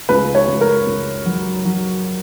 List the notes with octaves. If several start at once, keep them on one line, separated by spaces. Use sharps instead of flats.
C#2 B4
C#5
C#2
A#4
C#2
F#3
F#3